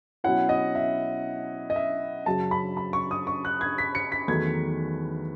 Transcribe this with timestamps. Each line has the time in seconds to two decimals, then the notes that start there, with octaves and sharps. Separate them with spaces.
0.24 B2 F#3 C#4 E4 F#5
0.49 D#5
0.75 E5
1.70 D#5
1.76 E5
2.26 F#2 C#3 F#3 A5
2.51 B5
2.77 B5
2.93 C#6
3.11 D#6
3.27 C#6
3.45 F#6
3.61 G#6
3.78 B6
3.95 C#7
4.12 B6
4.28 E2 D#3 F#3 A3 D#4 G#6